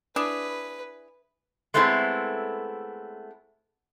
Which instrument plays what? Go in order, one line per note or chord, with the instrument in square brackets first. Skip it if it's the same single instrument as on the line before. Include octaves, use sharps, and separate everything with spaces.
[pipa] D4 E4 G#4 [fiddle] B4
[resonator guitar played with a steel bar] G#3 A3 B3 C4 E4